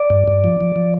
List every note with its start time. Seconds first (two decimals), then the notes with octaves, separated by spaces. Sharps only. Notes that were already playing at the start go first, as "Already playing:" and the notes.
Already playing: D5
0.10 G2
0.28 G2
0.44 F3
0.61 F3
0.76 F3